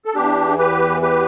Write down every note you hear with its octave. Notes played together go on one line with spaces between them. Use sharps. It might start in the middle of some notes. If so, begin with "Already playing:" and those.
A4
E2 E3 D4 G4
G4 B4
G4 B4